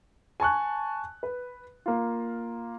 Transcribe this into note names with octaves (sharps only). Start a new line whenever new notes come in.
G#5 A5 C#6 F#6
B4
A#3 F4